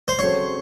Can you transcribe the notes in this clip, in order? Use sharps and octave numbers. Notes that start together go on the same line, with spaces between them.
C5
C#3 F#3 C4 F#4 A4 C#5